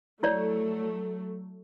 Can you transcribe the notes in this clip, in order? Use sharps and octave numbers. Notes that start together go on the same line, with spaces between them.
F#3 A3 E4 C#5 D5